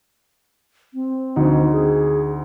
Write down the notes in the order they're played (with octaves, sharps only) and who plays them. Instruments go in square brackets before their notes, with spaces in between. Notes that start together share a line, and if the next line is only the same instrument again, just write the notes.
[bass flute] C4
[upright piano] D2 D#4
[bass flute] G#4